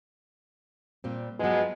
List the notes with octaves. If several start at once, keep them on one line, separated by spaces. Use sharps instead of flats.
A#2 G3 C4
G2 F3 F#3 G#3 B3